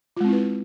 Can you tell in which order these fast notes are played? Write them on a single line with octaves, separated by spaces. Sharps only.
F4 G#3 C4 E4 B4